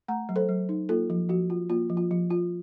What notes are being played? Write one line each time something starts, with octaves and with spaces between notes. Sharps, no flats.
A3 F#5 A#5
F#3
A4 C5
F#3
D#4
A#3 F4 A4
F3
F3 F#4
F4
A#3 F4
F3
F4
F3
F4